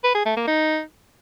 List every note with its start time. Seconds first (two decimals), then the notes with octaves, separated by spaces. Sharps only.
0.04 B4
0.15 G#4
0.26 A3
0.37 A#3
0.48 D#4